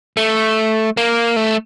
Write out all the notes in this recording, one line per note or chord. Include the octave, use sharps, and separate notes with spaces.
A3
A#3
A3